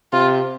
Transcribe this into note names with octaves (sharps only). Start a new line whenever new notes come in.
C3 F4